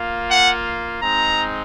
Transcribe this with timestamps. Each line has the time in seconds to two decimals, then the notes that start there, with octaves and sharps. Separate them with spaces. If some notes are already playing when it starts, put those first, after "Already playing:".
Already playing: A#3 F4
0.30 F#5
1.01 G#3 C4 D#4 A#5